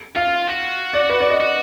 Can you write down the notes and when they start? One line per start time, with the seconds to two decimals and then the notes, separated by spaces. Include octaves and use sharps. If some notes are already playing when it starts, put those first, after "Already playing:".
0.16 F4 F5
0.48 F#4
0.93 D5
1.10 B4
1.20 D5
1.30 D#5
1.40 F#4